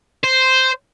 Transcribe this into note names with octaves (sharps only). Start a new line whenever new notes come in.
C5